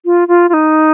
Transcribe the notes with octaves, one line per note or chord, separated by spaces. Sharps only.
F4
F4
F4
D#4